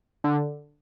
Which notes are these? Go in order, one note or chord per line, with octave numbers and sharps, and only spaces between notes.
D3